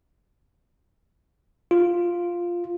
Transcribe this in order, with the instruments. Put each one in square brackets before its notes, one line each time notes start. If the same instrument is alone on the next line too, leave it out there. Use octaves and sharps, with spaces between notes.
[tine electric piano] F4